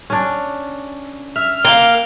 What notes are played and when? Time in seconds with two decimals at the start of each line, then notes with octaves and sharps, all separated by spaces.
0.10 C#4 D4
1.36 E5 F6
1.65 A#3 F5 G5